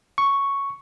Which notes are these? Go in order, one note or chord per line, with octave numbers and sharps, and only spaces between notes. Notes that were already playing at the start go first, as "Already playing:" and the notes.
C#6